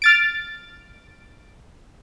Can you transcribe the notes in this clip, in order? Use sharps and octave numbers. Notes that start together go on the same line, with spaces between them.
F6 A6 D7